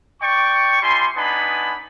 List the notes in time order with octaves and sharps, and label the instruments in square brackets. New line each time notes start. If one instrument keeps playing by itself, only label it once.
[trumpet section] D5 G5 C#6
G3 E4 G#5 C6
B3 D4 D#4 G#5 B5